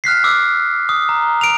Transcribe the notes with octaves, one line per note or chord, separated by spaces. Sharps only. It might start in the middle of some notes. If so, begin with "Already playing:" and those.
F6 F#6 B6 C7
D6 E6
D#6
A#5
D7 F7